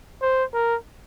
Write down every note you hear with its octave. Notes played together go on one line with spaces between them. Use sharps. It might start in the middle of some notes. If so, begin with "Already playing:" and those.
C5
A#4